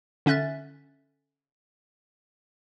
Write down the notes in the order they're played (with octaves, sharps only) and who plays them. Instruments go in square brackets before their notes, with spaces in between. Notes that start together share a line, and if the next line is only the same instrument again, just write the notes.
[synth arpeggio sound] D3 C#4 E5 F#6 A6